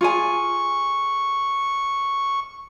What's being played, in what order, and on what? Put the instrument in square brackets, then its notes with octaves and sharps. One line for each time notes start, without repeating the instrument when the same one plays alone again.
[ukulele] F4 G#4 G#5 [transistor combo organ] C#6